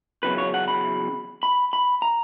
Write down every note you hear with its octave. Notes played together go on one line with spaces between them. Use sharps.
E2 C#3 F#3 B4
C#5
F#5
B5
B5
B5
A#5